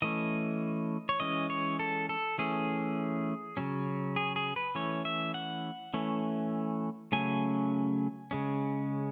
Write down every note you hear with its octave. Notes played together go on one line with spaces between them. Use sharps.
E3 A3 C#4 D#5
C#5
E3 G#3 C#4 D#5
C#5
A4
A4
E3 A3 C#4 G#4
C#3 F#3 C#4
G#4
G#4
B4
E3 A3 C#4 C#5
E5
F#5
E3 A3 C#4
C#3 F#3 A3 C#4 G#5
C#3 G#3 C#4